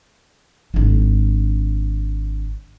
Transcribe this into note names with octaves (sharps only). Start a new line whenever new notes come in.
G#1 D4